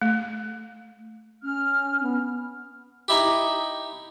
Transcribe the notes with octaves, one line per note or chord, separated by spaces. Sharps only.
A3
C#4 F6
B3
D#4 E4 G4